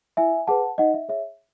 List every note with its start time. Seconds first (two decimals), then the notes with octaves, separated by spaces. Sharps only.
0.17 E4 E5 G#5
0.47 G#4 B4 F#5 A5
0.78 D#4 D#5 F#5
0.94 E5
1.09 G#4 C#5 E5